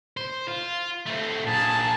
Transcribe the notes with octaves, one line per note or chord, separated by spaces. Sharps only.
C5
F4
A3 C4
A#2 G#4 A5